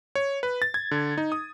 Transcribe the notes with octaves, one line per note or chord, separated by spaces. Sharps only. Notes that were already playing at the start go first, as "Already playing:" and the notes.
C#5
B4
A6
G#6
D3
D#4
D#6